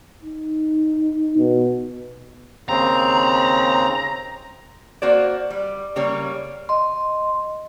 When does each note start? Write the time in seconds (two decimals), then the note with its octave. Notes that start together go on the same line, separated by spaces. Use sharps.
0.23 D#4
1.38 B2
2.69 D#2 C#3 C4 A#5
5.02 A#3 F#4 C5 D5
5.50 G3
5.96 C#3 G3 A#3 C#5
6.69 D#5 C6